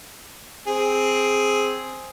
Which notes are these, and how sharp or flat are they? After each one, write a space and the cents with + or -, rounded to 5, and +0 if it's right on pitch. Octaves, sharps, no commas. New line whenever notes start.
C4 +0 G#4 +5